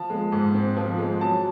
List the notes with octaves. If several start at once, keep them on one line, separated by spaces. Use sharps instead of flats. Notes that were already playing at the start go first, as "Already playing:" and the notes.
Already playing: F3 A5
G#3
G#2
C4
F3
G#3
F#3 A5